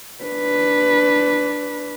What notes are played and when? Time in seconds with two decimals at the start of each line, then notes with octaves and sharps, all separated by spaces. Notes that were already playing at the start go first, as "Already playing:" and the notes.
0.24 D4 B4